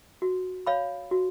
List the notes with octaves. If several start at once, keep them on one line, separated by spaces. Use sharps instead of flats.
F#4
C#5 F5 B5
F#4